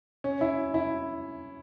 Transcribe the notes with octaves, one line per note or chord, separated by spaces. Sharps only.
C#4
E4
E4